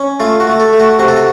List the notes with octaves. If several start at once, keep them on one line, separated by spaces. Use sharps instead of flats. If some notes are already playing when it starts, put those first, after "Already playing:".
Already playing: C#4
A3 F4
F#4
A3
A4
A3
F#4
C3 F#4
A4
F#4